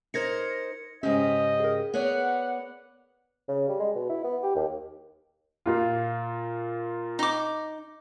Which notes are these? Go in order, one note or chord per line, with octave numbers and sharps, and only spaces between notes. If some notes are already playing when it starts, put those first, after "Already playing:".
D#4 A#4 C5 G#6 A#6 C#7
G#2 C#3 C#4 G4 D#5
G#4 A#4
B3 C#5 D5 F#5
C#3
G3
G#3
B2
E4
B3
G4
D#2
A#2 F4
D#4 D6